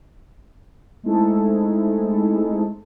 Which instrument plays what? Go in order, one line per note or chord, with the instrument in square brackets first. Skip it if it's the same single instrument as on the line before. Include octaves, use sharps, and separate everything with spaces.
[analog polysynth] G#3 A3 C4 D#4 E4 A4